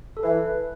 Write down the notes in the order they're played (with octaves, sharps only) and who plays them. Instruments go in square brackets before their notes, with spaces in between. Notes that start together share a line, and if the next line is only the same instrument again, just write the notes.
[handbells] A4
[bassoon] E3 [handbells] B4